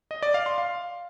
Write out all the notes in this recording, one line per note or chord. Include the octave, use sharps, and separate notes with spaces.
D#5
D5
F5
C6
F5